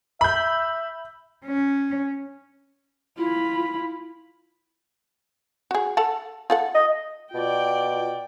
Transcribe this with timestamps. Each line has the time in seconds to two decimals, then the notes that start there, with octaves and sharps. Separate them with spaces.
0.21 E5 B5 G6
1.46 C#4
3.18 E4 F4 B5
5.71 F#4 G#4
5.97 A4 F#5 A5
6.50 F4 A4 F#5
6.75 D#5
7.34 B2 F4 D5 G5